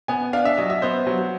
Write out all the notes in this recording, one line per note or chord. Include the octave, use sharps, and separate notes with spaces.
B3 G#5
D4 F5
E5
F#3 D#5
E5
B3 C5
F#3